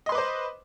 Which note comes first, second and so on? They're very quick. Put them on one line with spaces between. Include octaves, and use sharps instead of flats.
D#5 C6 B4 D6 C5